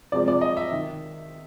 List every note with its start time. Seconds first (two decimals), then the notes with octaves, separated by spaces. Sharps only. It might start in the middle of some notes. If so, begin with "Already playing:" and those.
0.12 C3 F3 G#3 C4 D5
0.28 D5
0.41 D#5
0.57 E5
0.72 D#3